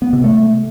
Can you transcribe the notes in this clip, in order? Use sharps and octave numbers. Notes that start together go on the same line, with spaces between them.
B3
C3
A3